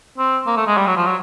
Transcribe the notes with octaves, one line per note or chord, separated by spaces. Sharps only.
C4
A#3
A3
G#3
G3
F#3
F3
F#3